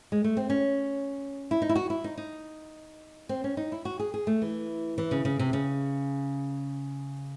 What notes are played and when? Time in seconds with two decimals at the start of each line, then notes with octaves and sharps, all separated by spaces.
0.12 G#3
0.24 A3
0.37 C4
0.50 C#4
1.51 E4
1.62 D#4
1.69 E4
1.75 F#4
1.90 E4
2.04 D#4
2.17 D#4
3.29 C4
3.44 C#4
3.57 D#4
3.72 E4
3.85 F#4
3.99 G#4
4.14 G#4
4.27 A3
4.42 E3
4.98 E3
5.11 C#3
5.25 C#3
5.39 C3
5.53 C#3